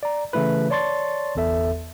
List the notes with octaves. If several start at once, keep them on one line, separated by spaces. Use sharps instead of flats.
D5 A#5
C#3 E3 A3 E4 B4
C#5 D5 A5 C6 C#6 A6
G1 E2 B3 A4 E5